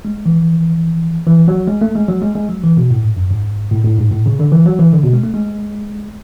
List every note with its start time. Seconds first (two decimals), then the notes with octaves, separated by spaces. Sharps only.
0.05 G#3
0.26 E3
1.27 E3
1.48 F#3
1.67 G#3
1.81 A3
1.95 G#3
2.08 F#3
2.22 G#3
2.35 G#3
2.49 F#3
2.63 E3
2.77 B2
2.90 A2
3.03 G#2
3.17 F#2
3.31 G#2
3.71 A2
3.84 A2
3.98 G#2
4.11 A2
4.26 C#3
4.40 D3
4.52 E3
4.66 F#3
4.79 E3
4.93 D3
5.04 B2
5.13 G#3
5.24 A3
5.34 G#3